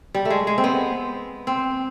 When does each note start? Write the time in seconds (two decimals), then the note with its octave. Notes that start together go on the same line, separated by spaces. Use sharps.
0.14 G3
0.25 A3
0.30 G#3
0.47 G#3
0.58 C4
0.64 B3
1.47 C4